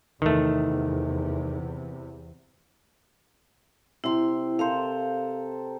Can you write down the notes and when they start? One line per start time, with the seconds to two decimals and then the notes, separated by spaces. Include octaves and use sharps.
0.22 E2 C3 D#3 A3
4.04 C3 E4 C6
4.59 A4 A#4 C5 F5